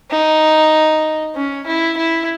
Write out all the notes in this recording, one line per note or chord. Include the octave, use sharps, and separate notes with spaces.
D#4
C#4
E4
E4